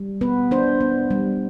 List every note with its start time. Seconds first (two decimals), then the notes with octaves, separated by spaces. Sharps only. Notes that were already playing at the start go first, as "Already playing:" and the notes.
Already playing: G3
0.21 B3 B4
0.51 D4 C5
0.81 B3
1.11 G3